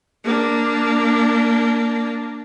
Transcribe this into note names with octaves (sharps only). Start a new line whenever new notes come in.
A#3 D4